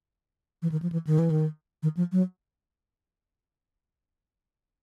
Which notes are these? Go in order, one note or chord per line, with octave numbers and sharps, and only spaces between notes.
E3
D#3
F3
E3
D#3
E3
D#3
D#3
F3
F#3